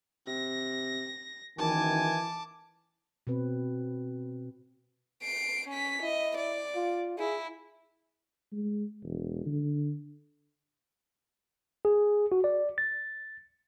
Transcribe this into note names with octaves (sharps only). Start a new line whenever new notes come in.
C3 A#6
F#1 D#3 E3 G#5 A5 D6
B2 C4 B4
C7 D7
C#4 B6
E4 D#5
D5
F4
E4 G#4
G#3
E1
D3
G#4
F#4
D5
A6